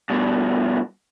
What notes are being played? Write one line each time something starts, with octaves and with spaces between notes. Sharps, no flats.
G2 B2